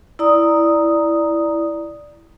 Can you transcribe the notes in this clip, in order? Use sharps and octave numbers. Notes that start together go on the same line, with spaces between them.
E4 D5 A#5 D#6